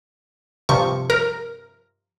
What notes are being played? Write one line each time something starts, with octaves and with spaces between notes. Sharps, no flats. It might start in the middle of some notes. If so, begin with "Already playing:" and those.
G2 C3 F3 C#6
A#4